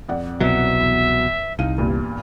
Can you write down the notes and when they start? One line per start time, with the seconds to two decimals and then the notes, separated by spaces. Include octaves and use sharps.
0.09 F2 D5 F#5
0.41 C2 B2 F#3 E5
0.80 E2
1.59 C2 D#4 F5 D#7
1.78 E2 G2 A#2